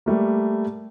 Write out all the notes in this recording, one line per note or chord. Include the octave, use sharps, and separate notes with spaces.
G3 A3 A#3